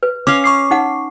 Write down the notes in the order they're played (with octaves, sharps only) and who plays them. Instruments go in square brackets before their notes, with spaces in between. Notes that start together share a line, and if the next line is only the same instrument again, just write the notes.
[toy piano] B4
[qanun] C#4 F5 [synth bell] D6
[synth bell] C#6 D6 C7
[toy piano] D#4 F#5